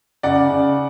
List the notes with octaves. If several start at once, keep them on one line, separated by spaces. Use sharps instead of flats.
C#3 D5 F#5
C#3